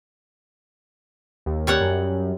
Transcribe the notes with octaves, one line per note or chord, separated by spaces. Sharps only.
D#2
G3 C#5 F#5
F#2